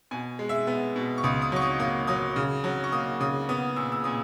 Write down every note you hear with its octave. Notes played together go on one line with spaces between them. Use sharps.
B2 G#5
G#3
E5
B3
B2
C#6
C#2 D#6
D#6
F#3 C#6
D#6
A#3 D#6
F#3 D#6
C#3
F#3
C#6
A#3 D#6
C#3 D#6
B3 D#6
A#2 E6
E6
A#2 D#6